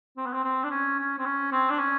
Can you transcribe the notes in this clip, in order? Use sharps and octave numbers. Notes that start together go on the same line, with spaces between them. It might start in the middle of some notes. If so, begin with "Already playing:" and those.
C4
B3
C4
C4
D4
C#4
C#4
C4
C#4
C4
D4
C#4